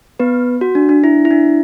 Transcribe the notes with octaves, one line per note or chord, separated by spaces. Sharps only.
B3 B4
F#4
D4
D4
E4
E4
D4